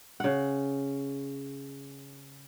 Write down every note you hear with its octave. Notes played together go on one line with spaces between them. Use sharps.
C#3 F#5